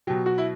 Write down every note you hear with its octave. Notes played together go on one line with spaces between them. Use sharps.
B2 F#3 G4
F#4
E4